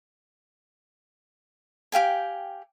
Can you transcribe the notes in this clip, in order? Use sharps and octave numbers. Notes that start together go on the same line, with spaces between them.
G4 F5 G5 G#5